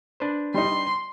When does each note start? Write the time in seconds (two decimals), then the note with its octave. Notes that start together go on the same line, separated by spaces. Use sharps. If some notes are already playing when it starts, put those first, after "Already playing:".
0.20 D4 B4 C5
0.54 G3 D#4 C6